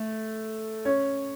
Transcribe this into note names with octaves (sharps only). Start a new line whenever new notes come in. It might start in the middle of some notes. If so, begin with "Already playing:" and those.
Already playing: A3
C#4 C#5